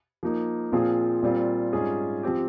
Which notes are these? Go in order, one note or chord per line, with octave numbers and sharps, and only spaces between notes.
F3 A#3 D#4
A#2 F3 C4 F4 G#4
A#2 G3 C4 F4
G#2 G3 C#4 F4 G#4
F3 C4 G4